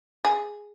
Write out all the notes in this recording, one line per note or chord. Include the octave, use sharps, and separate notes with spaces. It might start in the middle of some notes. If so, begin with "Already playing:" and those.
G#4